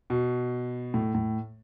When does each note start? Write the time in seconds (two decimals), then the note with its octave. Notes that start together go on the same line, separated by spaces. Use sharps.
0.10 B2
0.94 A2
1.15 A2